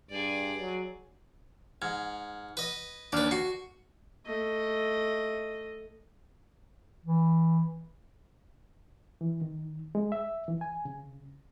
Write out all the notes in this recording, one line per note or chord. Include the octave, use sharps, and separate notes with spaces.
G2 G#4 D5
F#3
G#2 F#5 F6 G#6
B4 D#5
D#2 D4 B4 D5 F6
F#4 C7 C#7
A3 D#5
E3
E3
D#3
G#3
E5
E3
G#5
C#3